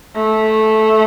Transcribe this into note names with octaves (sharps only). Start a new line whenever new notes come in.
A3